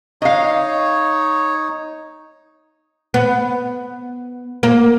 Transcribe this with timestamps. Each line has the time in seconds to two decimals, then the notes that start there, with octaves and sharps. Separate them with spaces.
0.22 D#4 C#5 D#5 F5
3.14 B3
4.63 A#3